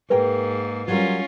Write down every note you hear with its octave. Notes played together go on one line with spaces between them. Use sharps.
G#2 A#3 G#4 A#4 B4 G5
F#3 G3 C#4 F4 A#4